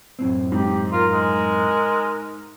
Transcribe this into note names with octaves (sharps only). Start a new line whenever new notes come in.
F#2 A2 C4
G#2 G4
F4 A#4
G#3